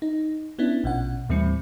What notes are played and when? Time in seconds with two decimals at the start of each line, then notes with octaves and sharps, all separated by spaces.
0.02 D#4
0.59 B3 C#4 D4 E4
0.84 A#1 B2 C#4 F#5
1.29 D#2 A2 E3 G3 C4 C#7